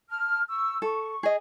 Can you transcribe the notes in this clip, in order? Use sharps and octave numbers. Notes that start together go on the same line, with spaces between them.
A5 F6
C#6 E6
A4 C#6
G#4 D#5